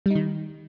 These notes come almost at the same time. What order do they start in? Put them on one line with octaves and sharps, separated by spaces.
G3 D#4 D#3